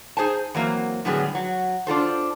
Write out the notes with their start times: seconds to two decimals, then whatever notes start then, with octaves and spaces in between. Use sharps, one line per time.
0.17 D#4 G#4 C5 G#5 A5
0.54 E3 F#3 A#3 C4
1.05 A2 D3 F#3 G3 B3 G#4
1.35 F#3
1.87 D4 F4 A4 C5